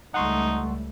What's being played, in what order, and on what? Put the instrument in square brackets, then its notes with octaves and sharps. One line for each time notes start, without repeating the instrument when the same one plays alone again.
[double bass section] C#2 G3 A3 [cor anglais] D#4 [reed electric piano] F#5 C6 C#6